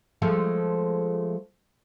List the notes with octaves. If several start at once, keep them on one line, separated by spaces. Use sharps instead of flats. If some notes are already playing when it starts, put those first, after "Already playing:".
F3 G#3 A3